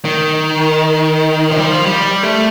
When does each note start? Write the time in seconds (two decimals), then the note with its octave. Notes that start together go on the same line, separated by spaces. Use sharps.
0.05 D#3
1.50 F3
1.58 G3
1.66 F3
1.86 G3
2.23 A3